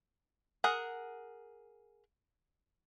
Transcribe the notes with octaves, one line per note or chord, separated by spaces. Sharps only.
G#4 A#4 F#5